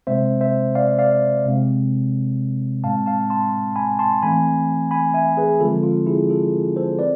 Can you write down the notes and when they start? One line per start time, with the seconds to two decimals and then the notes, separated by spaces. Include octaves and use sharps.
0.07 C3 G#3 C4 C5 E5
0.41 C5 E5
0.75 D5 F5
0.99 D5 F5
1.45 C3 G#3 C4
2.84 A2 G#3 C4 F5 A5
3.06 F5 A5
3.30 A5 C6
3.76 G#5 B5
3.99 A5 C6
4.23 E3 A3 C4 G#5 B5
4.91 G#5 B5
5.14 E5 G#5
5.37 G#4 B4
5.61 D3 F3 G#3 C4 F4 A4
5.83 F4
6.07 E4 G#4
6.30 F4 A4
6.76 A4 C5
6.99 C4 B4 D5